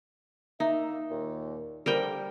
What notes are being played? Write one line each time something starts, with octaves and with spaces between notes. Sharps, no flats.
A#3 D#4 E5
D#2 A#2
D3 F3 G3 A#4 G5